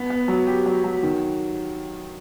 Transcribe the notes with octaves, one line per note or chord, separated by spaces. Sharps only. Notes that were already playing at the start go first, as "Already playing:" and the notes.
Already playing: B3
B3
F#3
G4
F#3
F#3
D#3